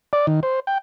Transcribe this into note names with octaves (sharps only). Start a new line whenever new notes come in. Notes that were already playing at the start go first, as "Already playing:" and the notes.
D5
D#3
C5
G5